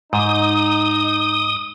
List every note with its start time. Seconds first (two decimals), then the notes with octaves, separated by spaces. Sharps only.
0.13 G#2 D#4 D#6